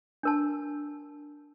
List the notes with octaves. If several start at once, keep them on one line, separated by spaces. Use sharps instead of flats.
D4 A#4 A5